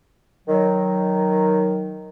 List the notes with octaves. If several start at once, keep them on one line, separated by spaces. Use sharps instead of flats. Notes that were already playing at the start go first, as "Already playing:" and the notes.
D#3 F#3